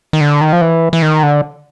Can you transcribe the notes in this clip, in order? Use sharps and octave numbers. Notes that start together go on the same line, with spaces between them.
D#3
D3
D#3
F3
E3
E3
D#3
D3